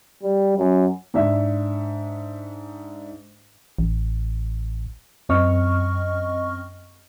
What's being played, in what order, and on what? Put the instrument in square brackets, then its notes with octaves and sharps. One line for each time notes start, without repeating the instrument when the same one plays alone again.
[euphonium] G3
F#2
[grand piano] G#2 D4 E5
[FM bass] A1
[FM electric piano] F#2 C4 D#5 C#6 F6